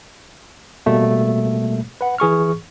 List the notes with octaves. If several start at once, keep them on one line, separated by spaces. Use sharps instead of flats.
B2 G3 A3 A#3
B4 F#5
E3 G#4 C#6 F6